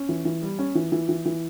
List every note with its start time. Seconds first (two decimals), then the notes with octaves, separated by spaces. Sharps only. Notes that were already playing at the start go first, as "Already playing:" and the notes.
Already playing: C#4
0.09 E3
0.25 E3
0.42 G3
0.59 C#4
0.75 E3
0.92 E3
1.09 E3
1.25 E3